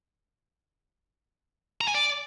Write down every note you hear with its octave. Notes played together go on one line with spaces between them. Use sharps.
A#5
G#5
D5